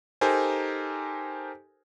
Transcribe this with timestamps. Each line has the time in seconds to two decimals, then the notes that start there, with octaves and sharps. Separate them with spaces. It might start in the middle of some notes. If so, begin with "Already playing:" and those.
0.21 D#4 G4 A4 A#4 C5 G#5